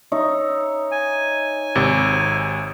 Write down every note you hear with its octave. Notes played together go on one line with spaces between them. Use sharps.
D#4 C#5 E5
G#5
G#1 C3